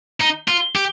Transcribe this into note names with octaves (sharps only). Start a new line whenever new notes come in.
D#4
F4
G4